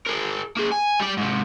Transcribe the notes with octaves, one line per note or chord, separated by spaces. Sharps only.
G#4 A#4
A#3 G#4
G#5
G3 D5
G#2 C3